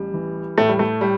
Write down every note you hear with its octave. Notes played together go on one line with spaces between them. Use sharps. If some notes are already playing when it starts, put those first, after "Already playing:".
Already playing: A1 G3
E3
A2 A3
G3
A3
G3